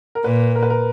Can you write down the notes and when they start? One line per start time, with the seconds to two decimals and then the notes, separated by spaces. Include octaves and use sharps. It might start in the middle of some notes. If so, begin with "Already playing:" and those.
0.15 A#4
0.24 A#2 B4
0.55 A#4
0.63 B4
0.70 A#4